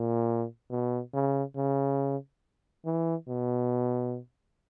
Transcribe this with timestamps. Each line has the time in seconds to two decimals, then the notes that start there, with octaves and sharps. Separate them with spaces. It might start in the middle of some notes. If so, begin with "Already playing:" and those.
Already playing: A#2
0.70 B2
1.13 C#3
1.56 C#3
2.85 E3
3.28 B2